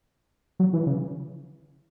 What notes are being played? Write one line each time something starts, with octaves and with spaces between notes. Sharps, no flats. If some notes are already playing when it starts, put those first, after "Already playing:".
F#3
E3
C#3